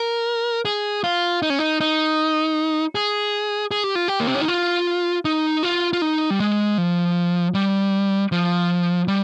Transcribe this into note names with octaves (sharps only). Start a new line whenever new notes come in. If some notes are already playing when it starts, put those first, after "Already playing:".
Already playing: A#4
G#4
F4
D#4
C#4
D#4
D#4
G#4
G#4
G4
F4
G4
A#3
C4
C#4
D#4
F4
D#4
F4
F4
D#4
G3
G#3
F3
G3
F3
G3